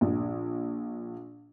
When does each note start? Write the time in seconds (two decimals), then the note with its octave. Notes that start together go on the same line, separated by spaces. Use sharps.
0.01 A#1